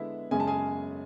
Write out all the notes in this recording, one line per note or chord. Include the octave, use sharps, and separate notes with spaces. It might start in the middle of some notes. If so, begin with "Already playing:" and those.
Already playing: D3 G#3 B3 E4 E5
F#2 C#3 G#3 C#4 G#5
A5
G#4 G#5